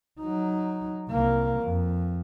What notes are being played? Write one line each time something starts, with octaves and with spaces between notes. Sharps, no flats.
F#3 D#4
C2 A#3
F2